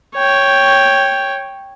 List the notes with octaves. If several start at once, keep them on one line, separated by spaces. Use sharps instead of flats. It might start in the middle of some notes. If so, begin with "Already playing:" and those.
C#5 G5